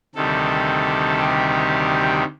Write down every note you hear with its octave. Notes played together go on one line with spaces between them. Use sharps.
D2 C3 D#3 G3 A4
G4